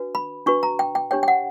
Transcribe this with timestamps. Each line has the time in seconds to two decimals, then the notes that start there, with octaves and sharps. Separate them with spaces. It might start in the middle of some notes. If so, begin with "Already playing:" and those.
Already playing: D4 F#4 B4
0.15 B5
0.46 D4 F#4 B4 C#6
0.63 A#5
0.79 G5
0.95 G5
1.11 D4 G4 C#5 G5
1.23 G5
1.28 F#5